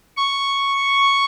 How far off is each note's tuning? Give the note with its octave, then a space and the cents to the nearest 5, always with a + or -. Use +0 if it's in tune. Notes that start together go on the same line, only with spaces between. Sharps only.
C#6 +0